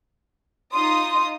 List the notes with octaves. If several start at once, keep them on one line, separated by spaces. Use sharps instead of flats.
D#4 F4 C6 D#6